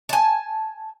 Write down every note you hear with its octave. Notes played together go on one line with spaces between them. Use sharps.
G#5 A5